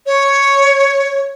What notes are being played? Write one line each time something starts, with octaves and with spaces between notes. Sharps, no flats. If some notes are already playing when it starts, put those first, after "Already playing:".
C#5